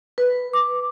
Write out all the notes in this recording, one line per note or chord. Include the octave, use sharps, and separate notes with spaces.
B4
D6